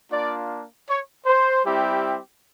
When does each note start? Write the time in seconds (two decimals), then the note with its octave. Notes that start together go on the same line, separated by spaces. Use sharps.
0.10 A#3 D4 F4 D5
0.87 C#5
1.26 C5
1.64 G3 C4 E4 G4